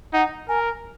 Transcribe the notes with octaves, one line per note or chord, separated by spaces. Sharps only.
D#4 F#5
A#4 G#5